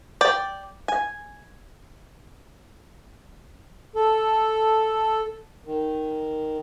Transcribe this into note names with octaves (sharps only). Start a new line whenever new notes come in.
D5 G5
G#5
A4
D#3